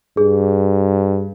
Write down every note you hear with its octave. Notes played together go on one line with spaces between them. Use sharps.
G2 G#4